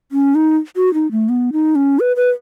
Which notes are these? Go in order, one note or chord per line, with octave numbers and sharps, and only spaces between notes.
C#4
D#4
F#4
D#4
A3
B3
D#4
C#4
B4
B4